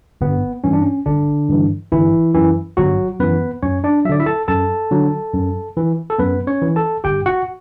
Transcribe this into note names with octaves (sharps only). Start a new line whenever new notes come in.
G1 B3
G2 E3 C#4
D4
C#4
G1 D3 D4
G2 E3
G1 E3 E4
F#2 E3
G1 F#3 F#4
F#2 E3 B3 B4
F#2 C#4 C#5
D4 D5
D3 F#3 D5 E5
E4 E5
A4 A5
F#2 A4 A5
D3 F#3
F#2
E3
A4
F#2 B3 B4
C#4 C#5
E3
A4 A5
G1 G4 G5
F#4 F#5